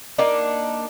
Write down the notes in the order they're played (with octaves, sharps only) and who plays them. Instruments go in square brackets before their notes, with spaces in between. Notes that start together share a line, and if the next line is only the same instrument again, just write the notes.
[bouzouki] A#3 D4 D#4